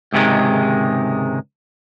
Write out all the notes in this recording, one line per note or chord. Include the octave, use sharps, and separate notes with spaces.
C#2 G#2 C3 D#3 G#3